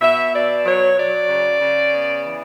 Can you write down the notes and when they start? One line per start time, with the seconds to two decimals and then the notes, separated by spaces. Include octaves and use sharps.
0.01 B2 E5
0.33 B2 D5
0.65 F#3 C#5
0.96 F#3 D5
1.28 C#3
1.60 C#3
1.92 B3
2.25 E3